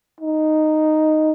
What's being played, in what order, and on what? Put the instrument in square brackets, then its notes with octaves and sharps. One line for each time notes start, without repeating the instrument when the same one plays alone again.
[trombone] D#4